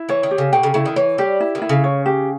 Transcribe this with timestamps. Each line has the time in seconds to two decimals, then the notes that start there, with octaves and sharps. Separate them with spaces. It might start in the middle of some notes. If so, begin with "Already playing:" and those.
Already playing: E4
0.09 E3 C#5
0.23 D#3
0.31 G4
0.38 C#3
0.53 B2 G5
0.63 C#3
0.74 C#3 E4
0.86 D#3
0.96 E3 C#5
1.18 G3 G4
1.40 E4
1.55 D#3
1.62 E4
1.69 C#3
1.84 C#5
2.06 G4